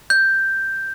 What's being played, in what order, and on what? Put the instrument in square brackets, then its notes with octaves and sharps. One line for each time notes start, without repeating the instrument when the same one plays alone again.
[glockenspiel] G6